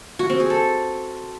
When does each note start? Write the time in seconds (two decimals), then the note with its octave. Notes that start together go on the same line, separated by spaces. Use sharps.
0.19 F#4
0.30 C4
0.40 G#4
0.50 A4